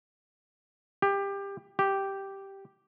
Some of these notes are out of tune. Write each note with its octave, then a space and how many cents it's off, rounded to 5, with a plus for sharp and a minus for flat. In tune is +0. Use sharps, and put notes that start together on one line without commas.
G4 +20
G4 -5